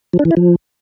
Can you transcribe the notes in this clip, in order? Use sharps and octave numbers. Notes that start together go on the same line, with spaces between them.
F3
D4
E3
E4
F3